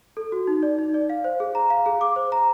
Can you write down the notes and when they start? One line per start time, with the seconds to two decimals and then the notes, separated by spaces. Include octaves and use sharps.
0.17 A4
0.32 F#4
0.47 D#4
0.63 D5
0.79 D#4
0.94 D5
1.10 F5
1.24 C5
1.40 G#4
1.55 A#5
1.70 F5
1.86 G#4
2.01 D6
2.16 C5
2.32 A#5